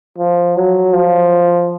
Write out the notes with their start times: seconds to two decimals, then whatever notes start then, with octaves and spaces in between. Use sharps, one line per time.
0.18 F3
0.56 F#3
0.93 F3